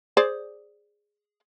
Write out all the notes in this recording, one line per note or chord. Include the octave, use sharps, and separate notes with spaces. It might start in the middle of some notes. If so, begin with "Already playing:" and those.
G#4 C5 D5